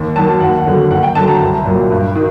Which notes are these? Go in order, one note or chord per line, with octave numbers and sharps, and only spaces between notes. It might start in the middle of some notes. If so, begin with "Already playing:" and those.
Already playing: D#2
D#3 F#3 A5
D#2 F#5
F#5
D3 F#3
D#2 F#5
G5
D3 F#3 A5
A#5
C2
A#2 F#3
G2
D#3